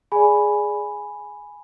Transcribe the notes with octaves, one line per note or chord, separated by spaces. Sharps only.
G#4 D5 G#5 B5